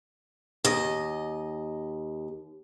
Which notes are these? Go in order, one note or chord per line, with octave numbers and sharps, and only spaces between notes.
D#2 D#5